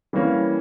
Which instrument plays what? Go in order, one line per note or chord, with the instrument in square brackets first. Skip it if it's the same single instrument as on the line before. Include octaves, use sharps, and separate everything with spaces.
[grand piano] E3 G3 A#3 C#4